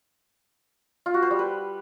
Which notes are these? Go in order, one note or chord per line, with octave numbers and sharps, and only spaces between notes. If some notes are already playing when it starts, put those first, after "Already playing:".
F4
F#4
C5
G3
B4